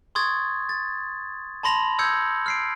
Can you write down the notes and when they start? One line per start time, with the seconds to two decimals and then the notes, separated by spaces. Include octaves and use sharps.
0.15 C6 C#6 D#6 G#6 A6
0.69 A6
1.63 A5 B5 C6 A#6 F7 F#7
1.99 D#6 E6 G6 G#6 C#7
2.46 F6 C7 D7